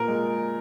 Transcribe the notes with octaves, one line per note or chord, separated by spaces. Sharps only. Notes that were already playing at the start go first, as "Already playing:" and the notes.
Already playing: A#2 A#4
G#3